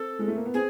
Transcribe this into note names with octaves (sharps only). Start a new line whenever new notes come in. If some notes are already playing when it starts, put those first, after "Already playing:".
Already playing: C4 A4
G#3
A3
A#3
B3
C4 G#4